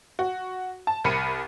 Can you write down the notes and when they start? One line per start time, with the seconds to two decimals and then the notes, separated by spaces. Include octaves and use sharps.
0.19 F#4
0.87 A5
1.04 C2 A#4 B5 C#7 D#7